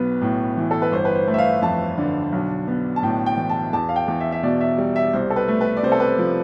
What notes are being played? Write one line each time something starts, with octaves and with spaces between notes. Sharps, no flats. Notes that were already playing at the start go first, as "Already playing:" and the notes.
Already playing: B1 B3 B4
A2
E3
A4
B4
G1 C5
B4
C5
A3
E5
F5
F2 A5
D3
B1
B3
A5
A2 G5
G5
E3
A5
E2 A5
F5
G5
E2
E5
E5
B2 D5
E5
G3
E5
C2 C5
A4
B4
A3
B4
D5
C3 C5
A4
B4
C5
F3